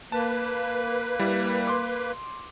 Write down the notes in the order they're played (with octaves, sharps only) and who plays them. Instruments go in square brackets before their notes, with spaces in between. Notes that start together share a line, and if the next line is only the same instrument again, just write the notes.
[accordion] A#3 B4 [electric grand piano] A5
[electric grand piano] G3 E4
C6 D6